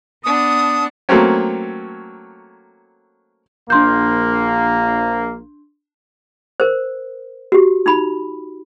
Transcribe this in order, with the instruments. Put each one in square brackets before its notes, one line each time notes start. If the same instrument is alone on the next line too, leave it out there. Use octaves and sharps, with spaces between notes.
[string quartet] B3 D4 F#5 [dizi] D#6
[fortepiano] F#3 A3 A#3 C4 C#4
[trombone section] A#1 A#3 [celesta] D4 C6 G6
[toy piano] A#4 C5
F#4 G4
D#4 F4 B5